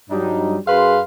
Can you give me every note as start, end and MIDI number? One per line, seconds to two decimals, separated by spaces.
0.10 0.57 43
0.10 0.57 54
0.10 0.57 55
0.10 0.57 62
0.10 0.57 63
0.67 1.00 42
0.67 1.00 68
0.67 1.00 71
0.67 1.00 77
0.67 1.00 84